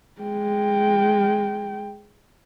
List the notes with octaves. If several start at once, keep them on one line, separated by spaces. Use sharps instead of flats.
G#3 G5